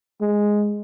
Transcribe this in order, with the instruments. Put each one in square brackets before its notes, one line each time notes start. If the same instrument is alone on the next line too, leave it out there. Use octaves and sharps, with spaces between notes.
[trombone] G#3